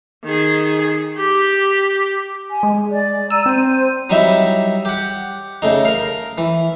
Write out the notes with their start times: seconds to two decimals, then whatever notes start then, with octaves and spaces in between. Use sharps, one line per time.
0.24 D#3 G#4
1.17 G4
2.51 G#5
2.63 G#3
2.91 D5
3.30 A#5 E6 D#7
3.46 C4 C5 D#7
4.10 F#3 G3 D#4 E4 E5
4.85 G4 F#5
5.62 C#3 A3 D#4
5.85 A#4 F5
6.38 E3